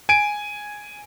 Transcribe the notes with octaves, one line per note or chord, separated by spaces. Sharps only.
G#5 D7